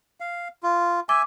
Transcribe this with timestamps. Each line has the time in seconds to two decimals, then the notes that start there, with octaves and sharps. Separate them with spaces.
0.20 F5
0.63 F4
1.09 E5 G#5 D6